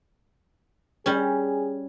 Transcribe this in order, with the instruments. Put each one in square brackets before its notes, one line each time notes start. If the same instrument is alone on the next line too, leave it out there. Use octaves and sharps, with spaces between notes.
[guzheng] G3 C#4 [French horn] G#4